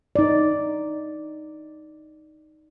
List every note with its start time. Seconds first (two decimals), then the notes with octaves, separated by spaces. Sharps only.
0.16 D#4 D5